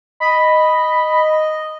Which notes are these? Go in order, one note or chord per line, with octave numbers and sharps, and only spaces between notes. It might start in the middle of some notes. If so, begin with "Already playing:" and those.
D#5 B5